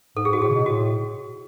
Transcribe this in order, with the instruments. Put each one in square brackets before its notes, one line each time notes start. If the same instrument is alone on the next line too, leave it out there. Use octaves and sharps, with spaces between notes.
[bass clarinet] G#2 [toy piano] A4
[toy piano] G#4
[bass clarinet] G#2 [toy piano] F#4
[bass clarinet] A2 [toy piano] G#4
[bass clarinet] C#3
B2
[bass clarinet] A2 [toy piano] F#4